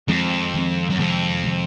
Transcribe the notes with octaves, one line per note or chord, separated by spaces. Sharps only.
F2 D#3 G#3 C4
D#3 G#3 C4
F#2
F2 C3 D#3 G#3
C3 D#3 G#3